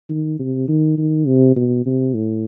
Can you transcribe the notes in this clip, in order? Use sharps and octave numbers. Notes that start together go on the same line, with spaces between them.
D#3
C3
D#3
D#3
C3
B2
C3
A2